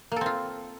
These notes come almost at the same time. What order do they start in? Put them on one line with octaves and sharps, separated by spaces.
A#3 A4 C4 F4